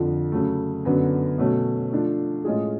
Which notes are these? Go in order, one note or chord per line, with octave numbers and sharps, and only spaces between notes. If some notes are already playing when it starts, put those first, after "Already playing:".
Already playing: F2 D3 F3
C#3 F#3 A3
F#2 D3 F#3 B3
B2 F#3 A3 C#4
F3 A3 D4 F4
A2 G#3 C#4 F4 G#4